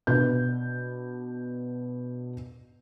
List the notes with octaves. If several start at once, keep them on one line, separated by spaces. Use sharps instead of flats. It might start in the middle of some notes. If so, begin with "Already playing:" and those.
B2 D4 B4 G6